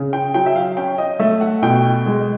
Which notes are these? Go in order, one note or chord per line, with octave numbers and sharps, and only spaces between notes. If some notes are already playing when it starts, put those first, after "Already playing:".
Already playing: C#3
G5
F#3 G5
E5
F5
C#4 G5
D#5
A3 E5
F#5
B2 G5
G#3